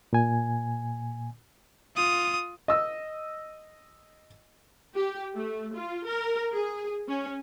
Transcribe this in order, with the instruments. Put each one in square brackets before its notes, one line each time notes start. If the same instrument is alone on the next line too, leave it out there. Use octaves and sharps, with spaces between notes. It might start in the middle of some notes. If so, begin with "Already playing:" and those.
[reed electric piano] A#2 G#5
[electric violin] F4 D#6
[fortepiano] D#5 E6
[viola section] G4
A3
F4
A#4
G#4
C#4